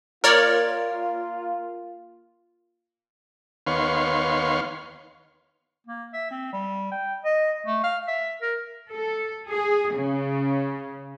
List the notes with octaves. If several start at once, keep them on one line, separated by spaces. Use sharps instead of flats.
A#3 F4 A#4 C#5 D5
D#2 B3 C#5 F5 C6
A#3
E5
C4
G3
G5
D#5
A3
F5
E5
A#4
A4
G#4
C#3